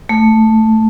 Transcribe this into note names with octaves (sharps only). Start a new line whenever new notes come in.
A3